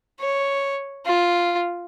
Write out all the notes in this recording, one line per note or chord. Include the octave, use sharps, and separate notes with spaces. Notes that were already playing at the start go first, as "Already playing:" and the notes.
C#5
F4